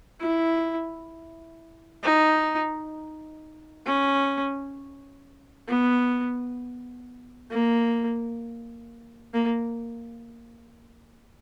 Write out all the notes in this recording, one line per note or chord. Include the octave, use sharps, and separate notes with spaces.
E4
D#4
C#4
B3
A#3
A#3